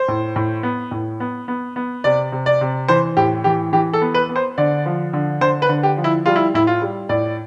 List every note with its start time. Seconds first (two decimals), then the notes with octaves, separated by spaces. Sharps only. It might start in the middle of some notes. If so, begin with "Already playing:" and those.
Already playing: C5
0.08 A2
0.36 A2
0.63 B3
0.91 A2
1.20 B3
1.48 B3
1.76 B3
2.04 C3 D5
2.32 C3
2.46 D5
2.61 C3
2.89 E3 C5
3.17 A2 G4
3.44 E3 G4
3.73 E3 G4
3.93 A4
4.02 B3
4.14 B4
4.29 B3
4.36 C5
4.58 D3 D5
4.86 F3
5.13 D3
5.41 D3 C5
5.62 B4
5.69 D3
5.83 G4
5.97 F3
6.04 E4
6.26 G3 F4
6.36 E4
6.54 A2 E4
6.67 F4
6.82 G3
7.09 A2 D5